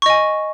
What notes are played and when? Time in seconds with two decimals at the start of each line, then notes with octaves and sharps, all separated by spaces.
0.02 C#6
0.06 D#5
0.10 G#5